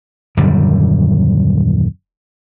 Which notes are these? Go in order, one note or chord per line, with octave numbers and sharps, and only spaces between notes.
D#1 F#2 D3 G3